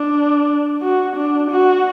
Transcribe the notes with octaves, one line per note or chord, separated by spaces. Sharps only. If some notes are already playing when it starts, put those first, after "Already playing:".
Already playing: D4
F#4
D4
F#4